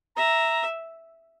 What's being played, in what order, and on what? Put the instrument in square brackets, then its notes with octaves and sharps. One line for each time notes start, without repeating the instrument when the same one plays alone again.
[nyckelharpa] E5 [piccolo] A#5